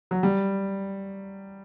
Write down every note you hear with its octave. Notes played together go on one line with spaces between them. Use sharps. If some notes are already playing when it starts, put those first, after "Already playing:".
F#3
G3